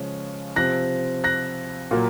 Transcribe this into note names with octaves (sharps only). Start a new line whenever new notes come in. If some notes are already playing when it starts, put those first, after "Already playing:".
Already playing: C#3 F3 G#3 C#4
C3 F3 C4 F#6 A#6
F#6 A#6
A#2 F#3 A#3